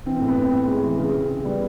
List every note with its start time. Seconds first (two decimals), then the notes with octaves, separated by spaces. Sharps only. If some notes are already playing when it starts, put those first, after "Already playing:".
0.06 E3 C4
0.17 A2 C4
0.28 B3
0.37 A2 C4
0.53 A2
0.67 G#3
0.83 E3
0.98 C#3
1.14 C#3
1.30 C#3
1.45 G3 B3